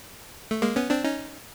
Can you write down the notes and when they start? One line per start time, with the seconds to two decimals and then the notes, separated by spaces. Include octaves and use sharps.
0.51 A3
0.62 G#3 A#3
0.76 B3 C#4
0.90 C4 D4
1.04 C#4 D#4